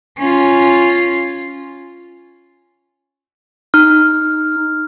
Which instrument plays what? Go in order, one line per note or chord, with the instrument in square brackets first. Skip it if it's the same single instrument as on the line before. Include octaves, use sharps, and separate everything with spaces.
[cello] C#4 F4
[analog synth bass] D#4 [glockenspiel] F6